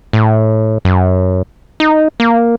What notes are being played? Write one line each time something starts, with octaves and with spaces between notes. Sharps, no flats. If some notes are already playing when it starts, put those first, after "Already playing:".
A2
F#2
D#4
A#3